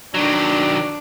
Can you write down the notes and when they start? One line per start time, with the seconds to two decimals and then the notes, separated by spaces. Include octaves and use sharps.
0.14 D#3 F#3 D4